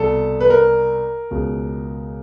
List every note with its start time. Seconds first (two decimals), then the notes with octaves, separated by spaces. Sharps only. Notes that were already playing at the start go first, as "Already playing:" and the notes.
Already playing: C2 B2 A4
0.41 B4
0.50 A#4
1.31 C#2 B2